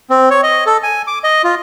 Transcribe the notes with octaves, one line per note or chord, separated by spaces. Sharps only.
C4
C#5
D#5
A4
G#5
D6
D#5
F4